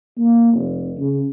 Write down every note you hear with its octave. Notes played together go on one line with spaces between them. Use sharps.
A#3
F1
C#3